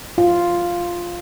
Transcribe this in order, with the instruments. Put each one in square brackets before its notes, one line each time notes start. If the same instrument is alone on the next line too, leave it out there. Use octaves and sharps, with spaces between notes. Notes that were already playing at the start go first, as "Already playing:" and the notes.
[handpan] F4